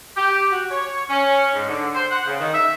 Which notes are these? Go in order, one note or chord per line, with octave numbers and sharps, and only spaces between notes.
G4
F#4
C#5
C#4
G#2
D3
C5
F#5
C#3
D#3
E5